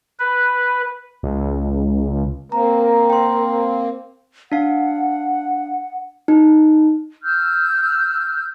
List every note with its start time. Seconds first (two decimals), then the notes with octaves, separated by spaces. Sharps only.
0.19 B4
1.23 C#2
2.52 A#3 C4 A#4 A#5
3.10 G5 C6
4.52 D4 F5 F#5
6.28 D#4
7.23 E6 F6 G6